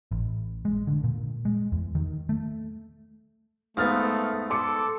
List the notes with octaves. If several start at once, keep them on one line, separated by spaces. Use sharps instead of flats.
A1
G#3
D3
A#2
G#3
E2
D#3
A3
G#2 A3 B3 F5 F6 A6
A4 C6 D6 C#7